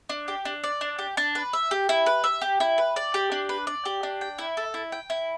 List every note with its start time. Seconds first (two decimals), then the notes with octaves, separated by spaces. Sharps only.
0.09 D4
0.28 G4
0.45 D4
0.64 D5
0.81 D4
0.99 G4
1.17 D4
1.35 B4
1.53 E5
1.71 G4
1.89 E4
2.06 B4
2.24 E5
2.41 G4
2.60 E4
2.78 B4
2.96 D5
3.14 G4
3.32 D4
3.49 B4
3.67 D5
3.86 G4
4.03 D4
4.21 G5
4.39 E4
4.57 A4
4.74 E4
4.92 G5
5.10 E4